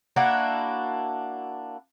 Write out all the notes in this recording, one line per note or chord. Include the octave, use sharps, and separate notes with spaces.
A#3 D4 E4 F#4